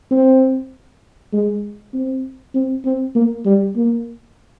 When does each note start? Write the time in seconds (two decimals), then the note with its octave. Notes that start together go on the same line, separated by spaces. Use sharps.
0.11 C4
1.33 G#3
1.94 C4
2.54 C4
2.85 C4
3.15 A#3
3.45 G3
3.76 A#3